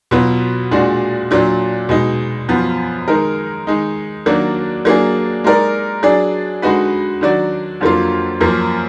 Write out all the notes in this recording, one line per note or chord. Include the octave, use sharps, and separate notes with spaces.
B2 F#3 B3 F4
A#2 G#3 D4 F#4
A#2 F#3 D4
B2 G#3 D#4
F#2 F3 B3
D#3 G#3 D#4 A#4
D#3 G#3 D#4
D#3 F#3 A#3 D4 F#4
F#3 A#3 D4 G#4
G#3 D#4 A#4 D5
F#3 D4 G#4 D5
D3 G#3 D#4 F#4 B4
D#3 F#3 D4 F#4 D5
F2 D3 F#3 A#3 F4
F#2 F3 A#3